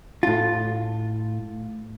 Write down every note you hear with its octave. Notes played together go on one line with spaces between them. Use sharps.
A2 F4